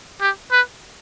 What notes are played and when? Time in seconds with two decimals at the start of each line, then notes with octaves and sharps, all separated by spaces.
0.21 G4
0.52 B4